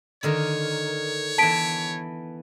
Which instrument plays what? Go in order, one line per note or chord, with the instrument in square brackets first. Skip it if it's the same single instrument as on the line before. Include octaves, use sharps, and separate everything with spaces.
[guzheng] D3 D#3 A#4 [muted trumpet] C#5
[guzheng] E3 B3 [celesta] A5 B6 D7